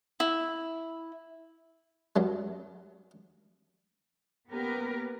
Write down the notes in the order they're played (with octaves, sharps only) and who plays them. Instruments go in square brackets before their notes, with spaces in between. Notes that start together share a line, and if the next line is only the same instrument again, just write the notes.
[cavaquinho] E4
[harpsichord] F#2 F#3 G3
[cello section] A#3 B3 C#4 G4 A#4 B4